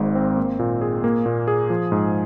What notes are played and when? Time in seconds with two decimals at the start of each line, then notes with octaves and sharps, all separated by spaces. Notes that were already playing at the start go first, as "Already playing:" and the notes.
Already playing: G#1 G#2
0.15 C4
0.37 A#3
0.59 A#2
0.81 G#4
1.04 A#3
1.26 A#2
1.48 G#4
1.70 F3
1.92 G#2